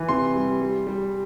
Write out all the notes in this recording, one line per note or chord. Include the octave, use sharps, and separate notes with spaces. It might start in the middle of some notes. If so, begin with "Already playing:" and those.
Already playing: E3
C3 C6
G3
G3
G3